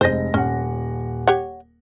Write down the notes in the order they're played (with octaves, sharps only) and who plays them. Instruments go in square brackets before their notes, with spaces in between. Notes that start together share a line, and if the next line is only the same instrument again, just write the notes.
[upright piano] F1 G#3 A#6 [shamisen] C5 D#5
[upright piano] D#1 F#5 [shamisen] C#4
[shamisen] G4 C#5 F#5